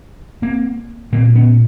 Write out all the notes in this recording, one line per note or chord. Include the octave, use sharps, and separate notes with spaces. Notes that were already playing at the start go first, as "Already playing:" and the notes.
A#3 C4
A#2 A#3 C4
B3 C#4